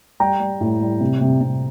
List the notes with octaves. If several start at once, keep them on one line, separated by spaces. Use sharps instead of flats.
G3 G5 A#5
G3
A2
G3
C3
C3
C3